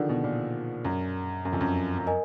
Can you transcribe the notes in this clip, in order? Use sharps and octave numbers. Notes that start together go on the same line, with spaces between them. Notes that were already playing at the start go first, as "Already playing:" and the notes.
Already playing: D3 D#3 F3 G#4 D5 F#5
B2
A#2
F#2
F#2
F2
F#2
F#2
A#4 D#5 G#5